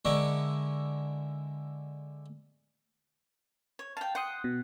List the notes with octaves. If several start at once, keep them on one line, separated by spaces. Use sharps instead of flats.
D3 G#3 E4 A#4 C#6 D6
C#5
F5 G5 A5
F#5 G5 C6 D#6
B2